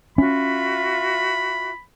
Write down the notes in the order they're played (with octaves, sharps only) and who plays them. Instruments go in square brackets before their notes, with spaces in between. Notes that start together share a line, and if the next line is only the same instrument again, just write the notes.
[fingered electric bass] C#4 [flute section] F4 F#4 E5 [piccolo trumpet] B5